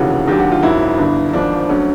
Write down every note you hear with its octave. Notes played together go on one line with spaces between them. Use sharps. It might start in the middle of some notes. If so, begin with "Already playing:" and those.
Already playing: F1 D#2 C#3 E3 F#4
D#2 D3 F#3 G4
F#4
F4
G#1 F#2 D#3 F#3 E4
G1 G2 D3
G#1 G#2 F3 D4
D2 D3 F#3 C#4